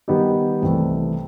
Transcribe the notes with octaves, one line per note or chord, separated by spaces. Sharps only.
D#3 G3 B3 D#4 G4
C2 C3 E3 A3